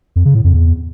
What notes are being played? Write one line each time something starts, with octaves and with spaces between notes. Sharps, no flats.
F2
C#3
A2
F2
E2